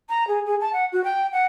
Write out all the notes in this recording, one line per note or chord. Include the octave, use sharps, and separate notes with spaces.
A#5
G#4
G#4
A5
F#5
F#4
G5
F#5